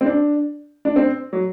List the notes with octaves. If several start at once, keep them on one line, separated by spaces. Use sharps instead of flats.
C4
D4
D4
C4
F#3